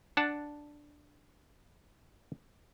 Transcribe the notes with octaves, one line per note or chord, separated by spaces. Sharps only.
D4 F#5 A5